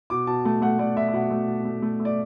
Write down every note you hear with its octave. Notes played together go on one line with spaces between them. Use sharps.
B2 D6
B2 A5
A3 A5
A3 F#5
A3 D5
A3 E5
E5
B2 F#5
A3
B2
A3
A3
A3
D5